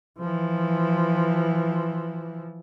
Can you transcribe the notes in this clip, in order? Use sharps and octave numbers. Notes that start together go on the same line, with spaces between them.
E3 F3